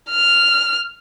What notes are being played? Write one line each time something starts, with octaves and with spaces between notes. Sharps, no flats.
F6